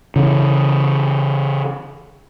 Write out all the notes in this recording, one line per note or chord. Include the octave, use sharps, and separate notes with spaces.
C#3 E3